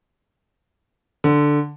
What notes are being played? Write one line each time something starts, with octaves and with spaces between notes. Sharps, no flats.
D3